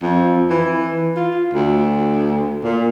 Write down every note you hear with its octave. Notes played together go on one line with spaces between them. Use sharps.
F2
E3
F4
D2
A#2